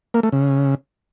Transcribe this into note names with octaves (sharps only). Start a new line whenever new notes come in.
A#3
A3
C#3